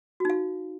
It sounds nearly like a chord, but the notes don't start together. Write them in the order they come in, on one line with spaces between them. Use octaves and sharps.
F#4 D#4 F5